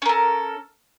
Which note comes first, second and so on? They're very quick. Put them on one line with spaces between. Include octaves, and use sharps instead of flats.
C#4 A#4 A4